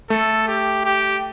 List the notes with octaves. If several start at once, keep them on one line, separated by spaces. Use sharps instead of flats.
A3 A4
G4
G4